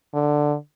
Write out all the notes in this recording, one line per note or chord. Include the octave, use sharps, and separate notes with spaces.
D3